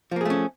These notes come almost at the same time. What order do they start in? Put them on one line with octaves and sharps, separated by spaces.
F3 A#3 G#4 A3 C#4